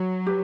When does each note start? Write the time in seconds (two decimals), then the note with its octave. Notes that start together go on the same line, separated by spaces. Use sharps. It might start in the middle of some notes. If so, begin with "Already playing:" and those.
Already playing: F#3
0.26 G4 B4